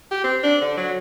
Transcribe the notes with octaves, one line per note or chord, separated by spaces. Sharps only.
G4
C4
D4
D3
F#3